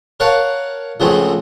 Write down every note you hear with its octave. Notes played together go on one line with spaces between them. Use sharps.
A#4 C#5 F5 F#5 A5
C#2 F3 F#3 G#3 A3 C4